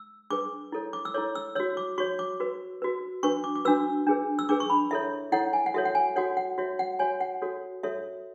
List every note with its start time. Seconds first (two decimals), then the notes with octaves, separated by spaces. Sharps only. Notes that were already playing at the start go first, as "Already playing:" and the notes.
Already playing: E6
0.30 D4 G#4 B4 D6
0.72 E4 A4 C#5
0.93 D6
1.05 E6
1.14 E4 A4 C#5 D6
1.35 E6
1.55 F#4 C#5 E6
1.77 D6
1.98 F#4 C#5 C#6
2.19 D6
2.40 F#4 B4
2.82 F#4 B4
3.23 D4 F#4 B4 C#6
3.44 D6
3.56 D6
3.65 D4 F#4 B4 E6
4.07 D4 G#4 B4
4.39 E6
4.49 D4 G#4 B4 D6
4.60 C#6
4.70 B5
4.91 E4 A4 C#5 E5
5.32 E4 A4 C#5 F#5
5.53 G#5
5.66 F#5
5.74 F#4 A4 C#5 E5
5.85 F#5
5.95 G#5
6.16 F#4 A4 C#5 F#5
6.37 F#5
6.58 F#4 C#5 E5
6.79 F#5
6.99 F#4 C#5 G#5
7.21 F#5
7.42 F#4 A4 C#5
7.83 F#4 A4 C#5 E5